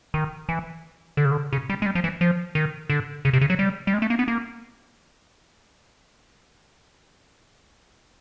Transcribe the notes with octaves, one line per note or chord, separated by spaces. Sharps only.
D#3
E3
D3
C#3
D3
C#3
G3
G#3
G3
F3
E3
F3
D#3
D3
C#3
C3
C#3
F#3
G3
G3
G#3
A3
A#3
B3
A#3